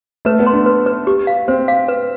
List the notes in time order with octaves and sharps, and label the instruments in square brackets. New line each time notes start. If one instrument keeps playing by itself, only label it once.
[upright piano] A3 [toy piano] B4
[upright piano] B3
[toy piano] C6
[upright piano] D4
[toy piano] B4
B4
G4
F5
[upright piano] C4 [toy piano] C5
[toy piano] F5
B4